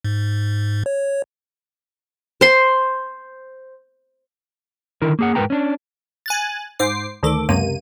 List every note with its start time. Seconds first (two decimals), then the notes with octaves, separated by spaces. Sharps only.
0.04 G#2
0.86 C#5
2.41 C5 C6
5.02 D3 D#3 E4 A#4
5.19 A#3 G#4 F#5
5.35 G#2 G3 A#4 B4 G5 A#5
5.50 C#4 D4
6.26 G#5 F#6 A6
6.79 G#2 C5 D6 C7
7.23 D2 D#3 A4 D6
7.49 C#2 F#2 C3 A#3 D#7